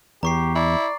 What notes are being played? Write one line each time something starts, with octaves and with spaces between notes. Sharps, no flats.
E2 G4 A#5 C#6 C7
E4 D5